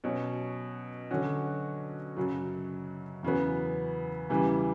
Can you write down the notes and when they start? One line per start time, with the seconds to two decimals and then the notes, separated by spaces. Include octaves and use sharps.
0.04 B2 F#3 C#4
1.11 D3 F#3 C#4 F#4
2.17 F#2 C#3 F#3
3.23 E2 C#3 F#3 B3
4.30 E2 C#3 E3 G3